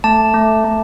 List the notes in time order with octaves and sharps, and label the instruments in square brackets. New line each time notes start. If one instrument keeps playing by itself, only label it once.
[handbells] A3 A5
A3
A3